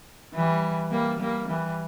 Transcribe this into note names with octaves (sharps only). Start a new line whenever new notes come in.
E3 G3
G3 A#3
G3 A#3
E3 G3